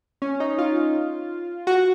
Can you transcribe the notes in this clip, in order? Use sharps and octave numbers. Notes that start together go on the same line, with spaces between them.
C#4
D#4
F4
F#4